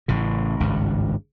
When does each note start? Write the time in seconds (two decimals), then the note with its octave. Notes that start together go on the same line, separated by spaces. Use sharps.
0.08 A1 A2 C#3
0.60 G#1 C#2 G2